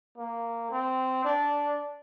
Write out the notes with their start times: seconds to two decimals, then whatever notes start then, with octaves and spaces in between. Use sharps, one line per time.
0.18 A#3
0.71 C4
1.24 D4